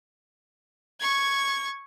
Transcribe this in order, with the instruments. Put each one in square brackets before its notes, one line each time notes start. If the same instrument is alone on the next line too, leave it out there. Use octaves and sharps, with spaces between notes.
[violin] C#6 G#6